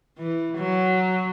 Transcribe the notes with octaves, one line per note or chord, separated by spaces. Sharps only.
E3
F#3